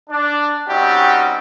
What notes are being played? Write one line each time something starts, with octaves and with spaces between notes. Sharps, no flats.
D4
G3 C4 C#4 D#4 F#4 G4